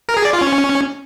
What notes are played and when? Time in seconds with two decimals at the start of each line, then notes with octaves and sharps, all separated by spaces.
0.09 A#4
0.17 G#4
0.25 D5
0.33 F4
0.41 C#4